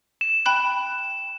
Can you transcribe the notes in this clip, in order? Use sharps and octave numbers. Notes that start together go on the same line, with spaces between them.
E7
G5 B5 F#6